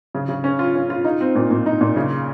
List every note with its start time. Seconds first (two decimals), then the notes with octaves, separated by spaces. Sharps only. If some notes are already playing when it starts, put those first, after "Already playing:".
0.15 C#3
0.29 C#3
0.44 C#4
0.59 F4
0.75 C#4
0.90 F4
1.05 D#4
1.21 C4
1.35 A#2
1.51 A#2
1.66 D#4
1.81 A#2
1.96 C#3